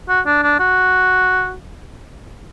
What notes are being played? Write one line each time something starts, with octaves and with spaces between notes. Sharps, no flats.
F#4
D4
D4
F#4